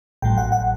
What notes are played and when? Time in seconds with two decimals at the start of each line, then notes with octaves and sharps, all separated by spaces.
0.22 A1 A2 F#3 G5
0.38 F#5
0.52 F#5